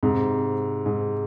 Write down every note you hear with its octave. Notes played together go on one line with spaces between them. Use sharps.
G#2 C3
G#2